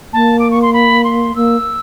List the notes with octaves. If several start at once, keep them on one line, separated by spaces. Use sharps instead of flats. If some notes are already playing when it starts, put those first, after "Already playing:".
A#3 A5
D6
C#6
C6
B5
C6
A#3 E6